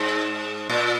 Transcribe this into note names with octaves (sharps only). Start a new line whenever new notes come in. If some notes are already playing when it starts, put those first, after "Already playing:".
Already playing: G#2
A#2